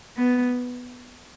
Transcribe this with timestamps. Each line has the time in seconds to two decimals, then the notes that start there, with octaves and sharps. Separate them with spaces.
0.17 B3